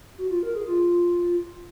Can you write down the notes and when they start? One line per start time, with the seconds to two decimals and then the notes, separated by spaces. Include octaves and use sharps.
0.18 F#4
0.31 F4
0.43 A#4
0.55 G#4
0.67 F4